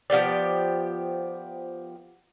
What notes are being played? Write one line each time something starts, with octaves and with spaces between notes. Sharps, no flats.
F3 B3 G4 D5